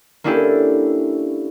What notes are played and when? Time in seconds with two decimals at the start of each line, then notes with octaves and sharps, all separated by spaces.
0.24 A#3 C#4 D4 E4 G4 A4